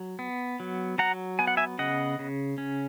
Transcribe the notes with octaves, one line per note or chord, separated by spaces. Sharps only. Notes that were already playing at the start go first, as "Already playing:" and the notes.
Already playing: F#3
B3
F#3
F#3 F#5 A#5
B3 G#5
F#5
E5 G#5
C#3 D#5 F#5
C#3
C#4